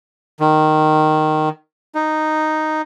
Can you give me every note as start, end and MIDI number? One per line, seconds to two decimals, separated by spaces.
0.40 1.49 51
1.95 2.82 63